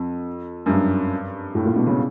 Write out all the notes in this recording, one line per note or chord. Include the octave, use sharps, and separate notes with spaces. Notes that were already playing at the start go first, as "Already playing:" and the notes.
Already playing: F2
F#2
G2
A2
A#2
B2
C#3